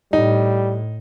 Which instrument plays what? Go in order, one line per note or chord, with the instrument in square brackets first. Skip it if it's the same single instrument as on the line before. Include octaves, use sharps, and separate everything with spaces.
[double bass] A2 [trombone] G3 [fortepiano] D#4